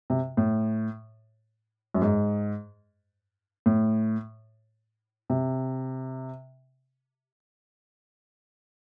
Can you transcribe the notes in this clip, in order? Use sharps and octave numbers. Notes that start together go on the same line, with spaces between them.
C3
A2
F#2
G#2
A2
C3